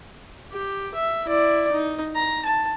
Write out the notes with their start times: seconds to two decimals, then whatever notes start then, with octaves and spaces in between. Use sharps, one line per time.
0.53 G4
0.95 E5
1.26 E4 D5
1.72 D#4
2.16 A#5
2.45 A5